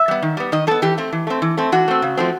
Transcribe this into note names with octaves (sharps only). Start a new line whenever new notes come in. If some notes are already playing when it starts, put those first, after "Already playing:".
Already playing: E5
G3 B3
D#3
G3 B3
D#3 D#5
G3 B3 A4
E3 G4
A3 C4
E3
A3 C4
E3
A3 C4
E3 F#4
A3 C4
C#3
F3 A3 C4